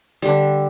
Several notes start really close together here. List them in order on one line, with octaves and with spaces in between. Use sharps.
G3 D3 D4